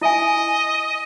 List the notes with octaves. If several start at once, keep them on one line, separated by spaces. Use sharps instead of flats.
E4 D#5 E5 G#5